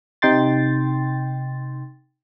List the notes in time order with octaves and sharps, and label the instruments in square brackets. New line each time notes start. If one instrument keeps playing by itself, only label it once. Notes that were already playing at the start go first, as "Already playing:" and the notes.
[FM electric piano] C3 D#4 G5 C6 A6